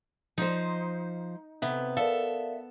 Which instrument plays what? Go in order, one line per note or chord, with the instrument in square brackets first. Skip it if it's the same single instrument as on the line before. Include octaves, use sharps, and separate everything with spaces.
[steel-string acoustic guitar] F3 C5 [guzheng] D#4
[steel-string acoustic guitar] C3 [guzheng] B3 [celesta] E5
[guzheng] A4 [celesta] A#4 D5 F5 [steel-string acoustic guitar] E5